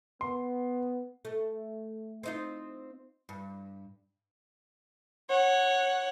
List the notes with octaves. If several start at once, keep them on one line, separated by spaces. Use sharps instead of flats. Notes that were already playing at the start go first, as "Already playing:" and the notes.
B3 C6
A3
C4 D#4 F4
G2
C#5 F#5